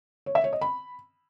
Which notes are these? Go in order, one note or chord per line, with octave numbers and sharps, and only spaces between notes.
C#5
E5
C#5
D#5
B5